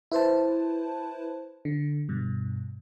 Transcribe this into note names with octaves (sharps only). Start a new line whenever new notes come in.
E4 B4 C5 A5
D3
G2 B2